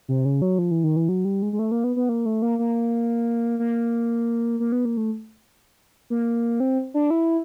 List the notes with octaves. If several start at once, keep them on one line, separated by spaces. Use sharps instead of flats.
C3
C#3
F#3
F3
E3
D#3
E3
F#3
G3
G#3
G#3
A3
A#3
B3
B3
A#3
A3
A#3
A#3
A#3
A#3
B3
A#3
A3
A#3
C4
D4
E4